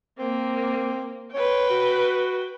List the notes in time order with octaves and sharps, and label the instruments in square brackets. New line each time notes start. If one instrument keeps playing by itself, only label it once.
[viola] A#3 [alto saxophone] C4
[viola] B4 G5 [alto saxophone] C#5
[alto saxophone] F#4